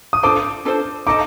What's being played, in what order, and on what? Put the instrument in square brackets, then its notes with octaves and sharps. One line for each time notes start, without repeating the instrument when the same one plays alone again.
[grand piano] D#6
[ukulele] D4 F4 A4 C5 [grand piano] D6
[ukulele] D4 F4 A4 C5
[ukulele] D#4 A4 D#5 A5 [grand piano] D6